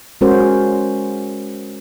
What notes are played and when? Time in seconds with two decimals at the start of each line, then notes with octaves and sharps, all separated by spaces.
0.21 G#3 C#4 F#4 A#4 C5